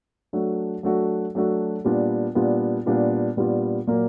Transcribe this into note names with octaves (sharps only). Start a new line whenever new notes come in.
F#3 A3 D4 F#4
F#3 A3 D4 F#4
F#3 A3 D4 F#4
A#2 G3 B3 D4 F4
A#2 G3 B3 D4 F4
A#2 G3 B3 D4 F4
A#2 G3 B3 D4 F4
A#2 F#3 A#3